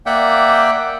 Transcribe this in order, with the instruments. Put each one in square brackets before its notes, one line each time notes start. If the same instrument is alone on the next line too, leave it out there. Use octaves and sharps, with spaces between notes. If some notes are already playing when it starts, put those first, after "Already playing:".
[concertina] A#3 D5 E5 F#5 G5